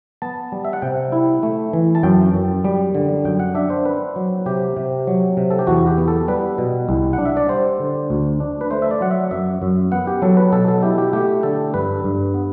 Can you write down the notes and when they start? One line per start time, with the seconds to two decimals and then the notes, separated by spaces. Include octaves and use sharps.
0.22 B3 A5
0.52 G3
0.65 E5
0.73 F#5
0.82 C3 G5
1.12 E4
1.43 A3
1.73 E3
1.95 A5
2.03 F#2 G5
2.34 F#2
2.64 G3
2.95 D3
3.25 F#2 G5
3.40 F#5
3.54 D4 E5
3.70 C5
3.85 C4 B4
4.16 F#3
4.46 C3 G4
4.77 C3
5.07 F#3
5.37 C3
5.50 A4
5.59 G4
5.67 E2 F#4
5.87 G4
5.98 B3
6.08 A4
6.28 G3 B4
6.58 B2
6.89 C2
7.13 F#5
7.18 D4
7.25 E5
7.37 D5
7.49 G3 C5
7.80 D3
8.10 D2
8.40 D4
8.61 B4
8.71 A3 C5
8.82 E5
8.91 D5
9.01 F#3 F#5
9.11 E5
9.31 F#2 E5
9.62 F#2
9.92 B3 F#5
10.07 G4
10.22 F#3 A4
10.37 B4
10.52 B2 A4
10.68 A4
10.83 E4 G4
10.98 G4
11.13 A3 G4
11.43 D3 A4
11.74 G2 B4
12.04 G2
12.34 B3